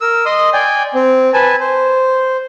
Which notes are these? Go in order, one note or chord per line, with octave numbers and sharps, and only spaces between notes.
A#4 E6
D#5 C6 D#6
D5 G5 G#5
C4
B4 G#5 A5
C5